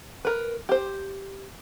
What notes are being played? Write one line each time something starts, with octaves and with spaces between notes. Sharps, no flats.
A#4 B4
G4 C5